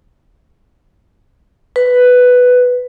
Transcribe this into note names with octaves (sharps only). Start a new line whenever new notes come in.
B4